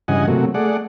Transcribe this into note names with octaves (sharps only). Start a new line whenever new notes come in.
G2 C#3 E3 D#5 F#5 G#5
C3 F#3 A3 A#3 F#4
A3 G#4 D5 F#5